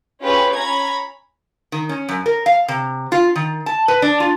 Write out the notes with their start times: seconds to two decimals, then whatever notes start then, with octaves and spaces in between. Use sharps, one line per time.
0.21 C#4 F4 G4 G#4 B4
0.53 C#4 A#5 B5 G#6
1.72 D#3
1.89 C#4
2.09 F#2
2.26 A#4
2.46 F5
2.68 C3
3.12 F4
3.36 D#3
3.66 A5
3.88 B4
4.02 D4
4.20 F4